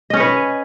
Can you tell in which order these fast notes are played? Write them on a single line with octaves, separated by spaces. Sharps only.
D#5 C#4 C#5 B4